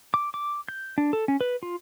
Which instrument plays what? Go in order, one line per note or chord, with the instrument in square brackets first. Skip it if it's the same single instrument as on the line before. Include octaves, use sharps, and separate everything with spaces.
[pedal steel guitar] D6
D6
G6
D4
A4
C#4
B4
F4